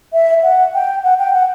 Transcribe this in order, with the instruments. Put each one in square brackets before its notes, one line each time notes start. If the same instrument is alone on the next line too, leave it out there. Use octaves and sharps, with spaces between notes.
[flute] E5
F#5
G5
F#5
G5
F#5